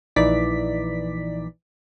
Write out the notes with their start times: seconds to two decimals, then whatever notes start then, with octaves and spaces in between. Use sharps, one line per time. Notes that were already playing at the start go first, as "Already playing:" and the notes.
0.16 A#1 E3 D#4 D5 B6